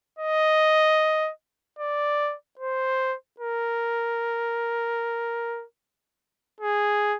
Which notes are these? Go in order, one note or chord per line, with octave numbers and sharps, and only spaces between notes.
D#5
D5
C5
A#4
G#4